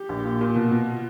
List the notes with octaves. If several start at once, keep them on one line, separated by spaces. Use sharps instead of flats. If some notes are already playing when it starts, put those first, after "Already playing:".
Already playing: G4
A#1
A#2
A#2
B2 F4
B2